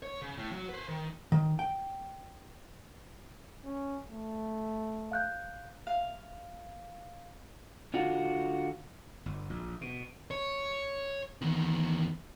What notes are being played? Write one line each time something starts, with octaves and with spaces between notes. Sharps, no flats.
C#5
C#3
A2
F#3
B4 C5
D#3
D#3
G5
C#4
A3
F5 F#6 G6
F5
D3 F4 F#4
G1
A#1
B2
C#5
E2 D#3